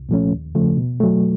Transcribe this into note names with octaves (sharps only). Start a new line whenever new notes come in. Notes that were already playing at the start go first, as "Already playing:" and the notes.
Already playing: C2
A#2 F3 A3 C#4
D#2
C#3 F3 A3
B2
F#3 A3